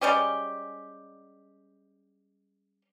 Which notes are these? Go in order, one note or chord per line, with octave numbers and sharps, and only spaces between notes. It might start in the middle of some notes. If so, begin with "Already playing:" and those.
G3 G#3 C#4 G4